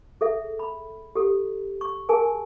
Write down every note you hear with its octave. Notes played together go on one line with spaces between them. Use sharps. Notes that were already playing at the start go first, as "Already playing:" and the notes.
G#4 A4 E5
B5
G4 A4
C#6
G#4 A#4 G#5 A5